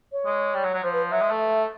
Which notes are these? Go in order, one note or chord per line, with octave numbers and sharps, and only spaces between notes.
C#5
G#3
G3
F#3
F#3
F3 C5
B4
F#3 E5
G#3
A3